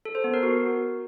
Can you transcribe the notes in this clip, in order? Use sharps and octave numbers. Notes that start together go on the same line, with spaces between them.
A4
C5
B3
A#4
F#4